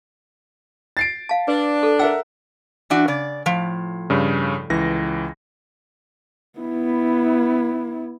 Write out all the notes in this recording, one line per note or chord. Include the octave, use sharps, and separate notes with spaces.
A6 C7 D7
F5 A5
D4 B4
A4
A#4 E5 F#5 E6
E3 D4 F#4
C#3 D5
A2 F3
G2 C#3
C#2 E3 A#6
B3 E4